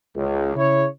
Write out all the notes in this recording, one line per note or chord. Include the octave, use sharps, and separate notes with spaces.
C#2
C#3 E4 C#5